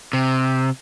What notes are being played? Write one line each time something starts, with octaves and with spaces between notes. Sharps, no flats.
C3